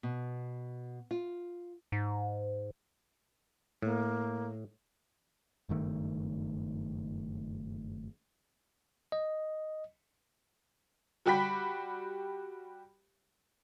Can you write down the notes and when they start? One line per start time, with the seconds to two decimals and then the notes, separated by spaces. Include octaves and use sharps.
0.03 B2
1.11 F4
1.92 G#2
3.82 A2 A#3
5.69 F#1 G2 D#3 A3
9.12 D#5
11.26 G3 F#4 G4 G5 B5 B6